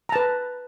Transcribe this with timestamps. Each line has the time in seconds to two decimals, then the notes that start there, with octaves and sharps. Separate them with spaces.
0.09 A#5
0.12 A5
0.16 B4